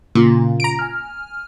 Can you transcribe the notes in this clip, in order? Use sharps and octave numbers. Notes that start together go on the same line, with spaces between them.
A#2 C#3 A#3 F4
A#5 D7
G#5 F6